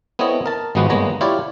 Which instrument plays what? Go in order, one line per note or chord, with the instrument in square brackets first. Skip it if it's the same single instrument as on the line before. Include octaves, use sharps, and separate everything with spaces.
[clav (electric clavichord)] B3 C4 E4 A4 C#5 D#5
A#4 A5
G#1 F3 G#3 B3 D#4 F#4
G1 G#3 A#3 B3 C#5 A#5
E4 F4 G4 C#5 D5